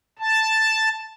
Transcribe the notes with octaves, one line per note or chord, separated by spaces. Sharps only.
A5